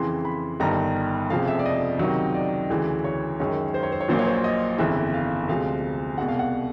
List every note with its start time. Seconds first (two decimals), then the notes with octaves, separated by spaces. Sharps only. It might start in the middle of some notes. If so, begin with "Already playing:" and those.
Already playing: F2 C#3 E3 C6
0.25 B5
0.60 G1 G2 D#3 A#5
1.30 F1 F2 C#3 F3 F5
1.48 E5
1.59 D5
1.66 D#5
1.99 C#2 C3 D#3 F#3
2.34 D5
2.70 D2 C#3 E3
3.04 C#5
3.40 F#2 D#3 G#3 C#4
3.74 C5
3.83 C#5
3.92 C5
4.01 C#5
4.09 A#1 A#2 F#3 A#3 C5
4.19 C#5
4.27 C5
4.44 D#5
4.78 G1 F2 C#3 E3 E5
5.14 F5
5.48 D2 C3 F3 G#3 F5
6.18 C2 B2 G#3 F#5
6.28 F5
6.39 F#5